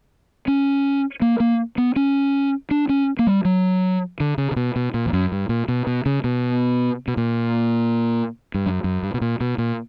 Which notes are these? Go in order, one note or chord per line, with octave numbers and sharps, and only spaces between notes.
C#4
A#3
A#3
B3
C#4
D4
C#4
A#3
G3
F#3
D3
C#3
C#3
B2
B2
A#2
E2
F#2
G2
A#2
B2
B2
C#3
B2
B2
A#2
G2
F#2
F#2
G2
B2
A#2
B2
A#2